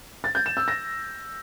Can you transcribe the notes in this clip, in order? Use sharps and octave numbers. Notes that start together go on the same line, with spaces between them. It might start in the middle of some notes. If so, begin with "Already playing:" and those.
A6
G6
E7
E6
A#6